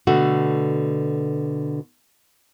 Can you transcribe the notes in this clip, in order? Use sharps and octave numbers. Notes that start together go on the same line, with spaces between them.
B2 D3 A3 F#4